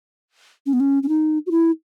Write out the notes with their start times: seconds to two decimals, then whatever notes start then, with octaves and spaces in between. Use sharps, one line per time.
0.66 C#4
0.73 B3
0.80 C#4
1.03 C#4
1.09 D#4
1.46 F#4
1.51 E4